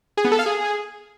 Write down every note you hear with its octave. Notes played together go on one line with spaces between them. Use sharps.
G#4
B3
A4
F5
G#4